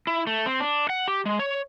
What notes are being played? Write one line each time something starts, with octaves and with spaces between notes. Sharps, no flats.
E4
A3
C4
D4
F#5
G4
G#3
C#5